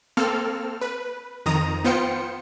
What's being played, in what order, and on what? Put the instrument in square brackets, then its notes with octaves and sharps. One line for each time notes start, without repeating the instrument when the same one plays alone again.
[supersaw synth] A#3 C4 A4 F6
B4
F2 D#3 A#5 D#6
B3 F4 C5 G5 C#7